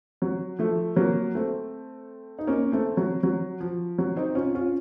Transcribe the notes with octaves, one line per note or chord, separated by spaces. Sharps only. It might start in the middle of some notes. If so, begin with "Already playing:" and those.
F#3
F3 A3
F#3 A#3
A3 C4
D#4
A#3 C#4
A3 C4
F#3
F#3
F3
F#3
C4 D#4
C#4 F4
C#4 F4